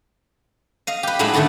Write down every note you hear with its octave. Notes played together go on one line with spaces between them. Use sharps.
D#5 F5
G4 B4
A2 F#3 G#3 D#4 E4
A2 D3 D#3 A3 D4